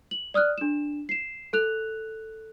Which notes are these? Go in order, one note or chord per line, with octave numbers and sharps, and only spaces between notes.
F#7
D5 D#6 F6 F#6
D4 E7
C7 E7
A4 F#6 F7